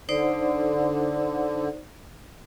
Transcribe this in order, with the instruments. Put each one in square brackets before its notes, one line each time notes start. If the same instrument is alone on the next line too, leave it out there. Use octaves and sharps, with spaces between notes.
[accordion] D3 [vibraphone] D#4 C5 D5